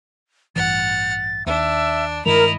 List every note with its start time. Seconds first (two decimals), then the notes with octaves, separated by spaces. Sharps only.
0.56 A1 G2 E3 F#5 F6 A6
1.46 D#2 D4 E5
2.26 G2 D#3 G#3 E4 A#4 D#5 F7